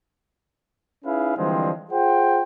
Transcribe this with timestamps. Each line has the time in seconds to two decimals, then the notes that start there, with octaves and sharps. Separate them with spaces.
1.05 C#4 D#4 E4 G#4 B4 F5
1.37 D3 E3 F3 G3 G#3 C4
1.91 F4 G#4 C5 F#5 G5